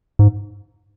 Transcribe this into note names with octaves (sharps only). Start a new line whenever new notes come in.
G#2